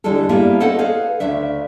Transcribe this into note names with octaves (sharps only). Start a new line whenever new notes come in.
E2 D3 E3 G3 G#3 A4
G3 A#3 B3 E4 G#4
A4 C5 C#5 D#5 F#5
G#4 B4 F5
D2 C#3 D4 E5